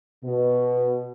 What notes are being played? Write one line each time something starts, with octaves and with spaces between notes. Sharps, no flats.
B2